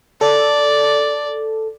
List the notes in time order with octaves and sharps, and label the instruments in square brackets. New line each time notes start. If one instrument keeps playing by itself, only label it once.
[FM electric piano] A4 [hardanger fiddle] D5